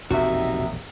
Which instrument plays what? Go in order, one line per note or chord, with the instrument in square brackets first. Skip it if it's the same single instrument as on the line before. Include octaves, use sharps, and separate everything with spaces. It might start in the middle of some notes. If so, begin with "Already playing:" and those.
[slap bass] E1 A#1 F2 [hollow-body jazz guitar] C3 F#4 [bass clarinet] D#4 [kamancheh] E5